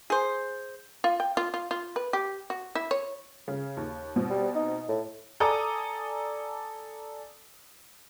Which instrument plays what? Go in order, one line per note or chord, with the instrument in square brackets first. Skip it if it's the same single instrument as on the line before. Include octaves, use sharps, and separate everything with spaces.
[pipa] G#4 C5
[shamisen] F4
G5
F4
F4
F4
B4
G4
F#4
E4
C#5
[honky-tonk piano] C#3
D#2
B2 C4
[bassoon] G3
D#4
A2
[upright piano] A4 D5 G#5 A#5 D6 D#6